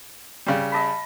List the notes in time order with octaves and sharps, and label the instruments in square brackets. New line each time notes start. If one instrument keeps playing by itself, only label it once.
[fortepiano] C#3 G3
[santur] D#5 A5 B5